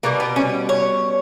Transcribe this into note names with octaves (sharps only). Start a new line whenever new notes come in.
B2 G3 A#3
B3
C#4
C#5